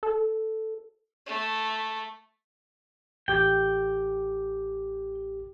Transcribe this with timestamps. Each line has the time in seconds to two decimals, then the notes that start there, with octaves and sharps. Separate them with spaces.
0.03 A4
1.26 A3
3.28 A1 G4 G5 D6